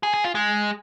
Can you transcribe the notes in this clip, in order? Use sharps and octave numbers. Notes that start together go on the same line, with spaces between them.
G#4
G#4
F4
G#3